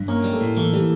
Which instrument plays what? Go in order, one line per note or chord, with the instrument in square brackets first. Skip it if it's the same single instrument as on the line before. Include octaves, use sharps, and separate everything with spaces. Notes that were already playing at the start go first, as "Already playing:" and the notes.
Already playing: [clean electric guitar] G2
[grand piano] A#3 [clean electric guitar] C#4
[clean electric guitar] G3
[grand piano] A3
[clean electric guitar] A2
[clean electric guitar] E3 [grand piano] A3
[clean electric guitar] E3 [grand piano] G3